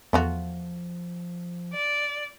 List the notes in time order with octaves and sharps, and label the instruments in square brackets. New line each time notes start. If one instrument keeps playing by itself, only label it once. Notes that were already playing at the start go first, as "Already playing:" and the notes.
[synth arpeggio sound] E2 [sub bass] F3 [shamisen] A3 F4 F#4
[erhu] D5